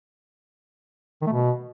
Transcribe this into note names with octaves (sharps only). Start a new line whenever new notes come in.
D#3
A3
B2